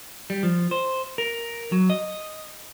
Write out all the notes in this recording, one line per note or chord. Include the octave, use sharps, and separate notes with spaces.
G3
F3
C5
A#4
F#3
D#5